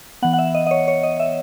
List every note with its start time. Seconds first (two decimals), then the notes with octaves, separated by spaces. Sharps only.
0.22 E3 B3 F#5
0.33 F#5
0.39 E5
0.55 D#5
0.67 D#5
0.71 C#5
0.88 C#5
1.04 D#5
1.20 E5